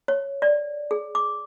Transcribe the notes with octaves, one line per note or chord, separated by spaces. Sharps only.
C#5
D5
G#4
D6